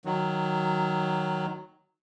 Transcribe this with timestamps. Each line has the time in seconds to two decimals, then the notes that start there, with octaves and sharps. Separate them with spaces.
0.05 D#3 F#3